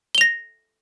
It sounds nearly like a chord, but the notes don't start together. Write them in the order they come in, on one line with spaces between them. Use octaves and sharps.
G7 F7 A#6